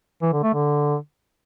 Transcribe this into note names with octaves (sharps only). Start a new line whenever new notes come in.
E3
D3
A3
D3